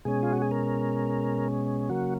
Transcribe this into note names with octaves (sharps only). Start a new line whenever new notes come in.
B2 G#3 C#4 G#4
F4
F#4
G#4
A#4
C#3 F#3 A#3 F#4